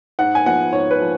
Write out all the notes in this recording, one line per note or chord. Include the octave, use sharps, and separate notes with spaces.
G#2 F#5
G#5
F3 B3 F#5
G#2 C#5
B4
F3